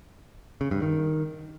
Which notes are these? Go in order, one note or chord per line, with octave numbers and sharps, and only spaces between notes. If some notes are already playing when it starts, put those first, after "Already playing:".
C#3
G2
D#3